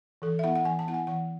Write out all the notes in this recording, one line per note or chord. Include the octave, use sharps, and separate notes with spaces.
E3 A4
E5
B3 E4 F#5
F#5
E3 G#5
A5
B3 E4 F#5
G#5
E3 F#5